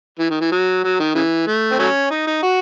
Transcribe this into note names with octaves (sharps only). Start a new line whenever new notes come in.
E3
D#3
E3
F#3
F#3
D#3
C#3 E3
A3
C4
F#3 A3 C#4
D#4
D#4
F#4